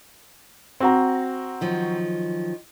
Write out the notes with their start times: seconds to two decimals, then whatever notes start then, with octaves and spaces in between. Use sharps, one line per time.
0.80 C4 F#4 A#5
1.61 D#3 F3 F#3